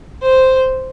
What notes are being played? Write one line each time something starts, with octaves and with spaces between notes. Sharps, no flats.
C5